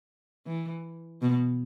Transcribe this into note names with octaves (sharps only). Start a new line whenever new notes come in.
E3
B2